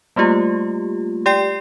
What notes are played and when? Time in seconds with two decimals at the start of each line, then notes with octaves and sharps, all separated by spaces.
0.16 G3 A3 A#3 F4 G4
1.26 G4 D5 G5 C7